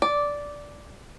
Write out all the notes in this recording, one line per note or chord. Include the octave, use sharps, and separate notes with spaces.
D5